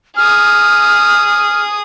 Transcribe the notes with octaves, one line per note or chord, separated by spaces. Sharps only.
G#4 D#6 F6